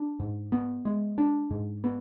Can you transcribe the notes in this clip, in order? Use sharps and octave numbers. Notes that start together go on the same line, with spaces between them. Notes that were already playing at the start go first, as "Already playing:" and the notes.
Already playing: D4
G#2
B3
G#3
D4
G#2
B3